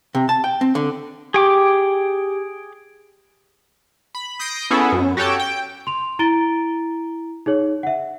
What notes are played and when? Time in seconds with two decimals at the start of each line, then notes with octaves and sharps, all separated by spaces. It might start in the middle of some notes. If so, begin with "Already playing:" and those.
0.15 C3
0.29 A5
0.44 G5
0.61 C4
0.75 D3
1.34 G4 G#4 G5 D6
4.15 B5
4.39 D#6 G6 A#6 C7 D7
4.71 B3 C#4 E4 G#4 A4
4.92 F#2
5.17 F#4 G4 A4 C#5 G5 A5
5.40 G5
5.87 C6 F7
6.19 E4 A#5 A6 D7 G7
7.46 D#4 G#4 C#5
7.83 E5 F#5